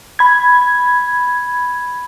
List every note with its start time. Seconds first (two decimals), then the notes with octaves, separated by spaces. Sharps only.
0.19 B5 G#6